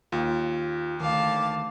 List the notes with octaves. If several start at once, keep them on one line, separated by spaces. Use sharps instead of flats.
D#2 F4
D2 D#3 F5 A5 D6